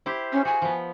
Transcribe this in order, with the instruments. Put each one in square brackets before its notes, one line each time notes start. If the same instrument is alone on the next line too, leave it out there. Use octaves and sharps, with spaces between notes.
[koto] E4 G4 C5
[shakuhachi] C#4
[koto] F#4 [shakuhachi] G#5
[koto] F3 B3